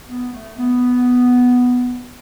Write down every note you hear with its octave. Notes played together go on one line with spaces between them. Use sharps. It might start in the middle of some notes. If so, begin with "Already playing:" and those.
B3
A3
B3